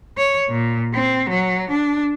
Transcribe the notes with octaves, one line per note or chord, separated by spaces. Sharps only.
C#5
A#2
C4
F#3
D4